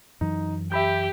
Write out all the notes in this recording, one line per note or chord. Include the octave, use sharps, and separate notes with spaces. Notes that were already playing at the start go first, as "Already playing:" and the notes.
F#2 E3 F#3 D#4
G4 E5 B5 G6